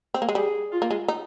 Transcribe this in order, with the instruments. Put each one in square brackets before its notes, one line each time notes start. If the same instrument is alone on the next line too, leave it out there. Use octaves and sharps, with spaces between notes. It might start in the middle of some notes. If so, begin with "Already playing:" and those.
[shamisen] C4
A#3
G#3
[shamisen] G3 [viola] G#4
[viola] F4
[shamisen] A#3
G#3
D#4